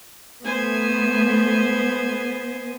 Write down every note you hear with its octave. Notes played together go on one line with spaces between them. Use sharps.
A3 B3 C5 G#5